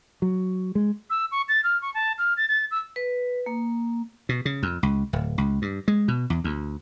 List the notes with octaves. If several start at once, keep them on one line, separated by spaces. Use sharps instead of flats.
F#3
G#3
E6
C#6
A6
F6
C#6
A5
F6
A6
A6
E6
B4
A#3
B2
C#3
F2
C#2
D1
C#2
G2
G#3
B2
E2
D2